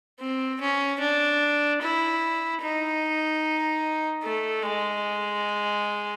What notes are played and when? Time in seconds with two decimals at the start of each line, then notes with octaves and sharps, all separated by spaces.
0.20 C4
0.60 C#4
1.01 D4
1.82 E4
2.62 D#4
4.23 A3
4.62 G#3